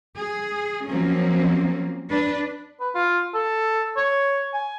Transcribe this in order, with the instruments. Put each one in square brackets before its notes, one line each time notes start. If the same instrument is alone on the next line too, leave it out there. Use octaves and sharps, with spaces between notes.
[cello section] G#4
F3 F#3 A#3 C4 C#4
D4 B4
[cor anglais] B4
F4
A4
C#5
G#5